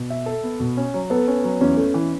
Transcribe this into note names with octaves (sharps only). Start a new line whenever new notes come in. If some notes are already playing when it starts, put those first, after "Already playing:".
Already playing: B2
E5
A4
B3
B2
C#4
F#3
B3 A4
C#4
F#3
E2 C#4
A3
E3